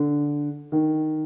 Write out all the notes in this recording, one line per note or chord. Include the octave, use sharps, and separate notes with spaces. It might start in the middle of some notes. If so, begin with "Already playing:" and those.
Already playing: D3
D#3